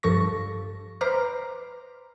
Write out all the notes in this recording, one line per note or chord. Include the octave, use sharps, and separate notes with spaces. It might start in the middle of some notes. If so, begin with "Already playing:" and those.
G2 F3 A4 C#6 A#6
B4 C5 A#5 D6 F6